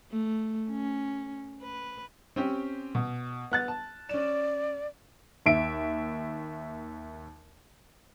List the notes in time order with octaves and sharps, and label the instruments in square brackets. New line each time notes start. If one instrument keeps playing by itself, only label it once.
[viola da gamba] A3
C#4
B4
[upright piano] C4 C#4 G4
B2
B3 F#6 A6
A5
[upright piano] C#4 E7 [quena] D5
[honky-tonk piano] D#2 E5 D7